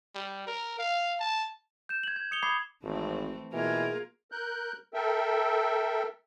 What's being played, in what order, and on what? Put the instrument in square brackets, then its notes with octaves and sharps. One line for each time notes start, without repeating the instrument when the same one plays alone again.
[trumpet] G3
A#4
F5
A5
[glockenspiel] G6 E7
G#6 F#7
G#6
D#6 C#7 F7 G7
B5 D6 D#6 G#6 C7 G7
[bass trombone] G#1 [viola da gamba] E3 A3 C4
[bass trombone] B2 [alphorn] E3 [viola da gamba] A#3 F4 A#4 [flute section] G#4 G#6
[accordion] A#4 F#6 G6
A4 A#4 E5 G5